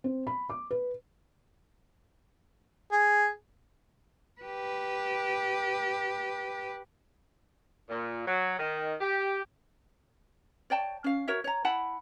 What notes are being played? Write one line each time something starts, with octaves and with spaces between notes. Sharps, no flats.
C4
B5
D6
B4
G#4
G4 B4
A#2
F#3
D#3
G4
C#5 D5 G5 A5
C#4 F5
F#4 A#4 C#5 E5
C#5 A#5
E4 F#5 A5 B5